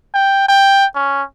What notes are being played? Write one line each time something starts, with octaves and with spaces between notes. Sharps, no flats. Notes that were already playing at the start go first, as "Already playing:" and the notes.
G5
G5
C#4